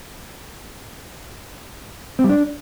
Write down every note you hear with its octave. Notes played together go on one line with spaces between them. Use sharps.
C4
G3
D4